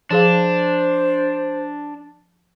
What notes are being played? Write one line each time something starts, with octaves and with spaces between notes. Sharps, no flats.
F3 D4 G#4 C5 F5